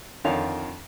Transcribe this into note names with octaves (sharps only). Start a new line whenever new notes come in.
F2 D3 D#3 F4 C#5 F5